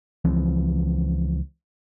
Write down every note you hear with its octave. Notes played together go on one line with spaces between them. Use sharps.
C#2 E3 F3 C4